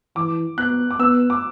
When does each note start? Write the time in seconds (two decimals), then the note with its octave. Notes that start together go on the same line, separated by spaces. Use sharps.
0.16 E3 D6
0.58 B3 F#6
0.91 D6
0.99 B3 E6
1.30 D6